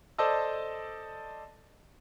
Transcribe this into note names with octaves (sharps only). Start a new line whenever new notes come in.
A4 C5 D5 D#5 A5 E6